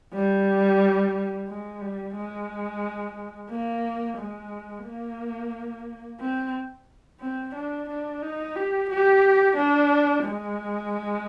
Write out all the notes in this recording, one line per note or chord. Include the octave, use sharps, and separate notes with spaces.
G3
G#3
G3
G#3
A#3
G#3
A#3
C4
C4
D4
D4
D#4
G4
G4
D4
G#3